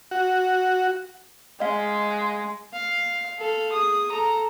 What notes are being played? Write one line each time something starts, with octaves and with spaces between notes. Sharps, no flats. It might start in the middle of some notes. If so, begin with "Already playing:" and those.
F#4
G#3 D#5 F5
F5
A4 F5
G#4 D#6
A4 A#5